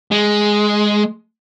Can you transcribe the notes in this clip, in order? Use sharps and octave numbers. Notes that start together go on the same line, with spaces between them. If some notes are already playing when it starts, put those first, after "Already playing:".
G#3